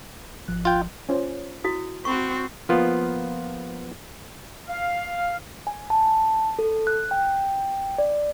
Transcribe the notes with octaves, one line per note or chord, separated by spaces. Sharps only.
G#1 F3 F#6
F4 G5
C#4 F4 C5
E4 F#4 D#6
C4 F#4 B5 C#6
F3 A#3 B3 F4
F5
G#5
A5
A4
F#6
G5
D5